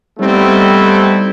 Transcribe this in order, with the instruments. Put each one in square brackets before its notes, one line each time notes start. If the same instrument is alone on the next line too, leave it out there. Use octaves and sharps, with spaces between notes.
[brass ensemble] G3 A3 B3 C4 D#4 E4